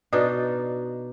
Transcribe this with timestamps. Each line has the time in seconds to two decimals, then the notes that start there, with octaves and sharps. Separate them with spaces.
0.12 B2 D4 D#4